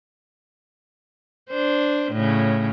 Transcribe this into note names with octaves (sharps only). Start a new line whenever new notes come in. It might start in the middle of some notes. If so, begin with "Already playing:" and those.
D4 C5
A2 C#3